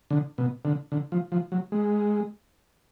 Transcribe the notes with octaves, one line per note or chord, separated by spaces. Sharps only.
D3
B2
D3
D3
F3
F3
F#3
G#3